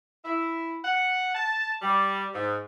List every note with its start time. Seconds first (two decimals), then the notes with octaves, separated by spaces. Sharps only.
0.25 E4
0.84 F#5
1.35 A5
1.82 G3
2.34 G#2